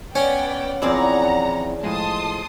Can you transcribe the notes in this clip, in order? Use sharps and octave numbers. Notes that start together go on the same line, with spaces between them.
B3 C#4 C#5 D5 G5
E2 F3 C4 E4 G#4 D5 F#5 A#5
A2 F3 G#3 A5 C6 D#6